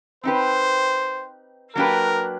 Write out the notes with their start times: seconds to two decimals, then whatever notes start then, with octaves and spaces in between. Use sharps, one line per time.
0.24 C4 D#4 G4 B4 C5
1.75 F#3 A#3 D4 G4 A#4 B4